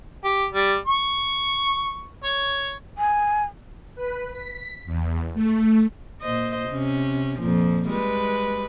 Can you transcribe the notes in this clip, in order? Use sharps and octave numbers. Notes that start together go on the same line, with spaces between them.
G4
G3
C#6
C#5
G#5
B4
B6
E2
A3
A#2 C5 D#5
C3 C#4
F2 A#2 F3
G3 G#3 B4